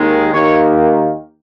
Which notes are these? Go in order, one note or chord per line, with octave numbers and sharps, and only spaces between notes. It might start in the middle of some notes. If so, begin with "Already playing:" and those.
Already playing: D#2 D#3 G#3
D#2 D#3 A#3 C#5